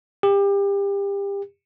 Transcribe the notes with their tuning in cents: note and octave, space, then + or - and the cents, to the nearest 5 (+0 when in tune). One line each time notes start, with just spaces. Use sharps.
G4 +30